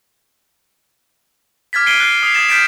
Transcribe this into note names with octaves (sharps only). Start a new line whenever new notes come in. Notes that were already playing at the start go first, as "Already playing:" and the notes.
D6 F6 G#6 A6 B6
C7 D7 D#7 G7
F#6 A6 C7
D#6 C7 F7
D#6 G#6 A6 E7
F6 G6 A6 B6 D7 E7